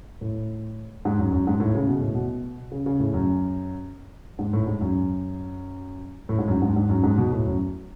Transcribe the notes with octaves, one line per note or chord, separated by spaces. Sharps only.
A2
G#2
F#2
F#2
G#2
A2
C#3
B2
A2
B2
C#3
C#3
A2
F#2
G#2
A2
G#2
F#2
A2
G#2
F#2
G#2
G#2
F#2
G#2
B2
A2
F#2